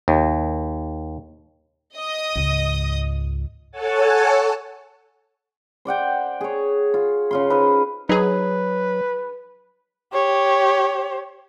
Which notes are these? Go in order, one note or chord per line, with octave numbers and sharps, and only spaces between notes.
D#2
D#5 D#6
C#2 G#2
A4 C#5 F#5 G#5 A5
C5 D5 F#5 G5
G#4 C#5
F4
C#3 F4 C6
D#4 B4 C5 F5
F#3 D#4 G#4 B4
G4 C#5